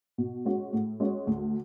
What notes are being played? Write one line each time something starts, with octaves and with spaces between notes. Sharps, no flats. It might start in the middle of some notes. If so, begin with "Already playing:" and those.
B2
G#3 C#4 F#4
A2
G#3 C#4 F#4
D2